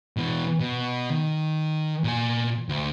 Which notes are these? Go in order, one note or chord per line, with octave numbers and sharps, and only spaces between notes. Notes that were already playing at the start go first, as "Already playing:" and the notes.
B2 E3
B2
D#3
A#2 G#5
D2